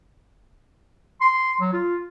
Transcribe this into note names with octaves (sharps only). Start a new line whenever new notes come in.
C6
F#3
F4